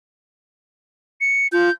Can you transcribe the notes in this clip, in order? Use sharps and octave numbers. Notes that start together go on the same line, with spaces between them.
C#7
F4 G6